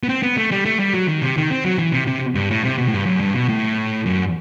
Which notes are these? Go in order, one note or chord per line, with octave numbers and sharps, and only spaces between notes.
B3
C4
B3
A3
G3
A3
G3
F#3
D#3
C3
D#3
C4
F#3
E3
C3
C3
G2
A2
C3
B2
A2
G2
F#2
G2
B2
A2
F#2